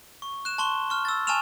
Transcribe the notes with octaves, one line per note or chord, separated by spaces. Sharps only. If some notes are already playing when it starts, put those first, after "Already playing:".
C#6
F#6 E7
A5 C6 C#6 G7
C#6 F6
E6 A6
G#5 A5 C#6 F6 E7 F7